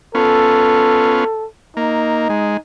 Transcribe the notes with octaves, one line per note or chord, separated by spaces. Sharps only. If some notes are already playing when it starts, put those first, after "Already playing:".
B3 C#4 F4 A4
A#3 D#4
G#3